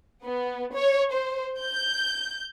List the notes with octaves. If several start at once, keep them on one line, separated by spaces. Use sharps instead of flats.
B3
C#5
C5
G6